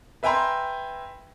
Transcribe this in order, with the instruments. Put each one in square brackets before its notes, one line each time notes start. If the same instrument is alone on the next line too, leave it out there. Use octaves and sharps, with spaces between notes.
[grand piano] B4 E5 G5 G#5 A#5 C6